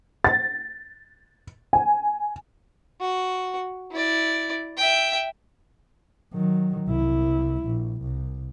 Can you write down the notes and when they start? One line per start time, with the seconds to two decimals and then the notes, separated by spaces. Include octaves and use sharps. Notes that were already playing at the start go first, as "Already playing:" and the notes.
0.24 A6
1.73 G#5
3.01 F#4
3.92 E4 D5
4.77 E5 G5
6.33 D#3 F#3
6.88 C2 E4
7.65 A#1
8.02 C2